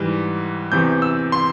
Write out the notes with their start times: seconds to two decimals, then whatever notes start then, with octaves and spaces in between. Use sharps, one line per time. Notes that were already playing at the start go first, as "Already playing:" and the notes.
Already playing: G#2 E3 G3
0.72 E2 C3 E3 G6
1.02 E6
1.32 C6